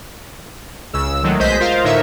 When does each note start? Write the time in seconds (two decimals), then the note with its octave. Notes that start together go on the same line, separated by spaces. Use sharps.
0.93 C#2 C#3 E6
1.23 D#3 F#3 G#3 A3
1.39 B1 G#3 C5 D#5 G6 B6
1.60 F4 A#4 C5 D#5 F5
1.84 A2 D3 D#4 A#4 C#5 E5